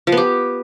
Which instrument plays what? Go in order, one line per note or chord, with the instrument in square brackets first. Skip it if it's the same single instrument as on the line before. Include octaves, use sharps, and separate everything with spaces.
[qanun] F3
B3
G4